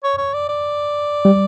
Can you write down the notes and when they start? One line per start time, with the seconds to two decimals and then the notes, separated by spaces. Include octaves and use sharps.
0.04 C#5
0.18 C#5
0.34 D5
0.49 D5
1.25 G3